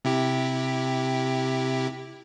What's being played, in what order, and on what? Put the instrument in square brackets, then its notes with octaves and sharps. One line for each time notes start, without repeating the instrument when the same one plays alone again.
[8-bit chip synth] C3 E4 G4